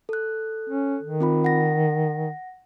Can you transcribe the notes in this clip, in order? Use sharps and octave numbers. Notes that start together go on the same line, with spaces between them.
A4 F#6
C#4
D#3
C4 F4 B5
F#5 A#6